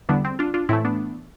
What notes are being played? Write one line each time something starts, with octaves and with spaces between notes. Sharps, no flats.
E2 D3 G3 B3 D4
C4
D4 F4
D4 F4
A2 E3 A3 C4 E4
B3 D4